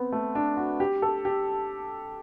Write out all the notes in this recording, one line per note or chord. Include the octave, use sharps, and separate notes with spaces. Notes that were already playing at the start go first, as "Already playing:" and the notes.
Already playing: B3 C4
A3
D4
F#4
G4
A4
G4